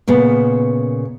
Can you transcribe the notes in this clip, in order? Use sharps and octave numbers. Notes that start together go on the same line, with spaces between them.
A#2 C#3 B3